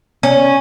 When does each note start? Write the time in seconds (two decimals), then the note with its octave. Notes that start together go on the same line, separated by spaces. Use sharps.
0.23 C#4